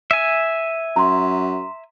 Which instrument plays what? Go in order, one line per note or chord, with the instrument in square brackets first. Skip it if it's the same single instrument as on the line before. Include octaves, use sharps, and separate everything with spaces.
[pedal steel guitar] E5 G#5
[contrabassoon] F#2 [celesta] A#5 C6